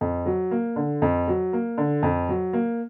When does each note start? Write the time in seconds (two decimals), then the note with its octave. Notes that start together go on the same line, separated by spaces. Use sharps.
0.01 F2
0.26 F#3
0.51 A#3
0.76 D3
1.02 F2
1.28 F#3
1.53 A#3
1.78 D3
2.03 F2
2.29 F#3
2.53 A#3